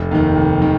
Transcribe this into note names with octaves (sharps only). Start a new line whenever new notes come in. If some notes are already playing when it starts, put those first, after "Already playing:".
Already playing: F1
D#2 D#3
F1
D#3